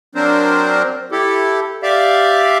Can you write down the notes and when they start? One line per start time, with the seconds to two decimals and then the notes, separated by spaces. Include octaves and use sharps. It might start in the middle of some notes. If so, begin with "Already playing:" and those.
0.15 F#3 C4 D4 A#4 C5
1.12 E4 G4 A4
1.83 G4 D5 E5 F5